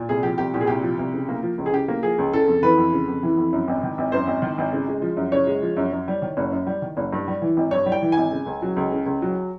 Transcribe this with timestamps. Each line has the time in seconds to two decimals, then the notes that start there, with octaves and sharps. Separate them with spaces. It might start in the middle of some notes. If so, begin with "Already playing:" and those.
Already playing: A#2
0.09 C2 G#4
0.23 F3 G4
0.38 C2 G4
0.54 A#2 G4
0.61 G#4
0.67 C2 G4
0.83 F3
0.99 C2
1.14 C#3
1.28 A#3
1.43 F3
1.58 C#2
1.66 G#4
1.73 C#3 G4
1.88 A#3
2.03 F3 G#4
2.18 C#2
2.33 C#3 A4
2.48 F2
2.63 E3 B4
2.78 F2
2.93 C#3
3.08 F2
3.23 E3
3.37 F2
3.53 F#2
3.68 G#1
3.83 D#3
3.98 G#1
4.12 F#2 C5
4.27 G#1
4.42 D#3
4.58 G#1
4.73 C#3
4.88 G#3
5.02 F3
5.17 F#2
5.32 C#3 C#5
5.47 G#3
5.62 F3
5.77 F#2
5.92 F#2
6.08 G3
6.22 D#3
6.37 F#1
6.52 F#2
6.67 G3
6.82 D#3
6.97 F#1
7.13 G2
7.28 G3
7.42 E3
7.57 G#1
7.71 G2 C#5
7.86 G3
7.92 G5
8.02 E3
8.12 G#1 G#5
8.32 C#3
8.46 C#2
8.62 F#3
8.76 C#2
8.92 C#3
9.06 C#2
9.22 F#3